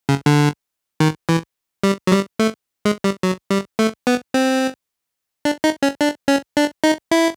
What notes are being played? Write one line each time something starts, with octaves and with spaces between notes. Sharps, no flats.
C#3
D3
D#3
E3
G3
F#3
G3
A3
G#3
G3
F#3
G3
A3
B3
C4
D4
D#4
C#4
D4
C#4
D4
D#4
E4